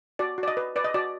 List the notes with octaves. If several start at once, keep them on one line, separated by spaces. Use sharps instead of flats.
F#4 D5
F#4
D5
D#5
B4
B4 D5
D#5
F#4 D5